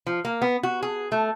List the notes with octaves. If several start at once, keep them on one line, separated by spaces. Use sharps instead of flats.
F3
A#3
B3
F#4
G#4
A3